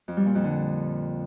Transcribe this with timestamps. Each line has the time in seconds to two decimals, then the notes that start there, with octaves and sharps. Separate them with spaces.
0.08 F2
0.17 G3
0.26 A#2
0.35 F2
0.44 D3